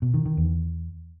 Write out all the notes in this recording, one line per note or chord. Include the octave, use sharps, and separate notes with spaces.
B2
D#3
D#3
E2